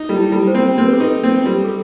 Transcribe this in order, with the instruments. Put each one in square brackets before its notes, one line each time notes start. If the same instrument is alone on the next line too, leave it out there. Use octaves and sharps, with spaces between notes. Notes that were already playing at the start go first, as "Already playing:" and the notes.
Already playing: [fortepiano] D#4
G3
[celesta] E4
[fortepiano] G3
[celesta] C5
[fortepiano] C4
[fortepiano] C4 [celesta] C5
[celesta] B4
A4
[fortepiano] D#4 [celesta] B4
[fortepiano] C4
G3
[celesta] A4